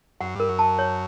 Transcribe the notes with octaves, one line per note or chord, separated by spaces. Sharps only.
F#2 F#5
G2 A#4
F#2
A5
C#5